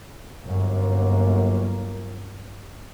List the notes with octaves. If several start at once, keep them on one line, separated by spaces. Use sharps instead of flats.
G1 F#2 A#3